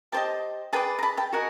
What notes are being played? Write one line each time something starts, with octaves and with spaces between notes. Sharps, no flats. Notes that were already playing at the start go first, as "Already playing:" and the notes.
G4 C5 D#5 G5 A5
G#4 B4 D5 G5 A5
A#5
A5 B5
G5 A5
F#4 A#4 D#5 F#5 G#5